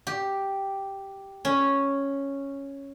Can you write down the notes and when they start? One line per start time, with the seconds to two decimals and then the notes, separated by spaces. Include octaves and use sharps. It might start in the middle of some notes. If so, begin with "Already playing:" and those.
0.07 G4
1.45 C#4